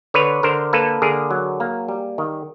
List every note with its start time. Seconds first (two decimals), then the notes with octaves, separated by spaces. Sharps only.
0.14 D3 B4 C#5
0.43 D3 A#4 C5
0.73 A#3 A4 B4
1.02 D3 G#4 A#4
1.31 F#3
1.60 A#3
1.88 G3
2.18 D#3